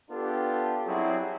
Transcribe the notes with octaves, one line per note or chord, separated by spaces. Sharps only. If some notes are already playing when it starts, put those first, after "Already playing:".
B3 D4 F4 G4 A4
F#3 G3 C4 E4 F#4 G#4